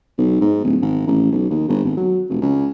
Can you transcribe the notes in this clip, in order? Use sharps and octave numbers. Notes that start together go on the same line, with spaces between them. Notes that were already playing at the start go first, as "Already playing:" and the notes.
B1
G#2
D1
G#1
A1
B1
D#2
G1
G#1
F#3
F1
C#2